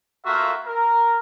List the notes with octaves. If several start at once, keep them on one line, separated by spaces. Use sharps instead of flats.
A3 A#3 F4 F#4 A#4 E5
A#4